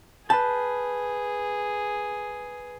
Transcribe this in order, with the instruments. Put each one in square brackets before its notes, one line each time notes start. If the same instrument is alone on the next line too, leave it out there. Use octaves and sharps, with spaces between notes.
[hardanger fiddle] G#4 [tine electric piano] B4 B5 G6 [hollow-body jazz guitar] A5